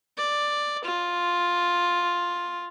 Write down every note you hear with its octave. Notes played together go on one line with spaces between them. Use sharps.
D5
F4